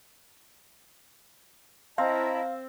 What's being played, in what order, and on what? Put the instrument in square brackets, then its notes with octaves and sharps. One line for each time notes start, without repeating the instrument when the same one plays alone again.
[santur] C4 [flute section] E4 D#5 [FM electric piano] F5 [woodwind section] A5 A#5